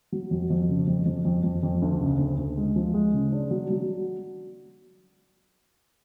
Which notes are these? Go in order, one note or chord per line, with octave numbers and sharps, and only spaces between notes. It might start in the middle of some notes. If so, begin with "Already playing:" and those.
F#3
F2
F2
C#3
F2
F2
F2
F2
F2
D2
C#3
D2
D2
G#3
F3
G#3
C#3
D4
F#3
F#3